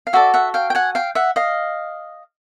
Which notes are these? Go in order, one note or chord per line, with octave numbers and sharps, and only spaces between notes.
F5
F#4 A4 D5 E5
E5 F#5
F5 G5
G5
F#5 G#5
F5 G5
E5 F#5
D#5 F5